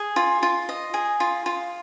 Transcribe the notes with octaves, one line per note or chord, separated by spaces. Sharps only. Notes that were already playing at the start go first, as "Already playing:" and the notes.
Already playing: G#4
F4
F4
D#5
G#4
F4
F4